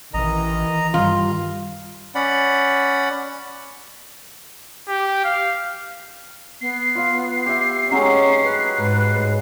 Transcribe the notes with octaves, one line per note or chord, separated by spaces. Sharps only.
A1 D#3 E3 D#5 A#5
G2 D#3 G3 F4
C#4 D5 F#5 B5
G4
F5
B3 C7
F4 F5
G4 E5
D#3 F#3 G#3 C#4
B4
G#2